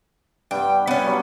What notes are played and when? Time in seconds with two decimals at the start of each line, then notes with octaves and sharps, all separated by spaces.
0.51 G2 B3 G5
0.87 B3 C#4 F5
1.04 F#3 G3